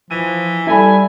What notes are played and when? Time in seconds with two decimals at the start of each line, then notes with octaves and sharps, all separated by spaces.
0.11 E3 F3 D#7
0.67 G3 E4 A4 G#5 B5